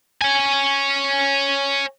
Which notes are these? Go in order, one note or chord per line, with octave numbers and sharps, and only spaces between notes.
C#5 G#5